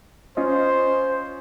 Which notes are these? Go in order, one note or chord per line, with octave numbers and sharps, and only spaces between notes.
C#4 F4 C5 D#5